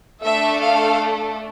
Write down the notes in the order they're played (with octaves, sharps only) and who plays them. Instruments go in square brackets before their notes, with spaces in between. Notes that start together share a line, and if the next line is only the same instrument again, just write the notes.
[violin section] A3 D4 A4 E5
F5